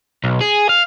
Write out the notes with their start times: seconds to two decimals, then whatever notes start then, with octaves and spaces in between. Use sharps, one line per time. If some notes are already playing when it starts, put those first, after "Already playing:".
0.24 B1
0.41 G#4
0.69 F5